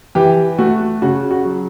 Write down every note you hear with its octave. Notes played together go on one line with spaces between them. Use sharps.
E3 G4
A3 F#4
C#3 F#4
F#4
F#3